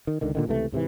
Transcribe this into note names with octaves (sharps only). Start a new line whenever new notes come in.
D#3
C#2 D3 D#3
A#2 D3 D#3
C#2 C3 E3 A3
G#2 C3 D#3 E3